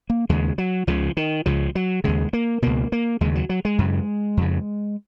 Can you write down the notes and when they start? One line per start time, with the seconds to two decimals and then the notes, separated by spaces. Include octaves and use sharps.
0.10 A#3
0.29 D#2 C#3 G#3
0.58 F#3
0.87 C#2 C#3 F3
1.17 D#3
1.46 C#2 C#3 F3
1.75 F#3
2.04 D#2 C#3 G#3
2.33 A#3
2.62 C#2 B2 A#3
2.92 A#3
3.21 D#2 C#3 G#3
3.35 F#3
3.49 F#3
3.65 G#3
3.78 F#2 C#3
4.37 F2 C#3